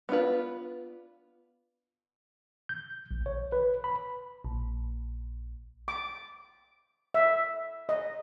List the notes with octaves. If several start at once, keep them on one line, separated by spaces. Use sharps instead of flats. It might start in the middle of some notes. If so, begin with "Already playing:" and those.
B3 D4 F4 B4
G6
A#1
C#5
B4
B5
A#1
D6
E5
D#5